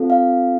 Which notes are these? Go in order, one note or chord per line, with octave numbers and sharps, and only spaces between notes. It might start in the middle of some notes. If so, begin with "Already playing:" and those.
Already playing: C4 F4 A4
F5